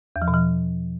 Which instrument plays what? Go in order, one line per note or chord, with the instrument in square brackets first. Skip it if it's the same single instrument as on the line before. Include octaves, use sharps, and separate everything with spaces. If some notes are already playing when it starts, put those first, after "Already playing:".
[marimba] E2
F3
B2
F3